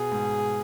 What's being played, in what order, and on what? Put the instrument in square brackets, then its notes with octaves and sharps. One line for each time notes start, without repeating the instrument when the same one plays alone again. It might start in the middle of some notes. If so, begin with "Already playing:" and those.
Already playing: [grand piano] B2 [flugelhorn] G#4
[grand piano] G#2